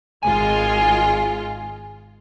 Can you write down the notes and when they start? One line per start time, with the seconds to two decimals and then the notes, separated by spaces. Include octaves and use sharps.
0.23 G#1 G#3 F4 G#5